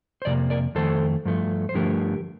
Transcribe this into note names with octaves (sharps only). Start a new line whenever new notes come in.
C5
F2 C3 A#3 D5
A#4 D5
F2 D#3 A3 A4 C5
G2 F3 A3
C5
G2 D3 F3 A3 G4 A#4